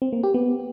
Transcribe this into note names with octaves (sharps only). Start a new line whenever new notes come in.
C4
A#3
G4
B3